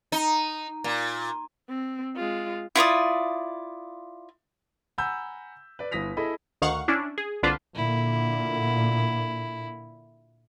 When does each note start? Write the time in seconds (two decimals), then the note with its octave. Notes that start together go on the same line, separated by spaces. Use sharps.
0.12 D#4
0.84 A#2
1.69 C4
2.16 G#3 F4
2.75 E4 F4 D5 D#6
4.98 F#5 G#5 A#5 B5 E6 G6
5.79 B4 D5
5.91 G1 E4 D#6 A#6 B6 F7
6.17 E4 G#4 A4 D#5 B5
6.62 D2 D#3 F5 F#5 C#6
6.88 C#4 D4 E4
7.18 G#4
7.43 C2 D3 D4 F4 B4 C5
7.75 A#2 D3 A#3 E4